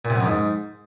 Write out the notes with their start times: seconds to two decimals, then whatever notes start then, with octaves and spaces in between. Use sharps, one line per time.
0.05 A#2
0.10 C3
0.15 F#2
0.20 F2
0.26 G#2